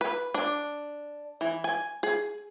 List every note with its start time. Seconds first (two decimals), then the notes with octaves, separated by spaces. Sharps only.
0.01 B4
0.34 D4
1.41 E3
1.64 G#5
2.03 G#4